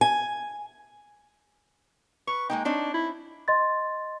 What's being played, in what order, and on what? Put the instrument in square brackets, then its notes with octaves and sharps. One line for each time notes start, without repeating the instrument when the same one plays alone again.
[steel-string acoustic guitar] G#5
[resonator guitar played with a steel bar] B4 [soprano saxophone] C#6
[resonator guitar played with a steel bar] G#3 A#3 D#4 [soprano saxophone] G5
[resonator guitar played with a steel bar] C4 D#4 C#5 [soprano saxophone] D4
[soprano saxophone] E4
[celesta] D#5 C6 A6